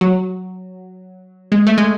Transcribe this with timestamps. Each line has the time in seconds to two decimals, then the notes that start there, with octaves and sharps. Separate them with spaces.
0.01 F#3
1.52 G#3
1.66 A3
1.78 G#3